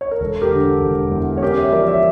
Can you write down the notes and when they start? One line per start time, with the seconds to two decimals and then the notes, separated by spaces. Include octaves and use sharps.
0.01 C#5
0.11 A#4
0.21 E1 A4
0.41 G4 A#4
0.51 D3
0.61 A4
0.82 E1
1.11 E2
1.37 C#5
1.42 C#4 G4 A#4
1.58 C#5 E5
1.72 F3 A#4 D5
1.88 C#5 E5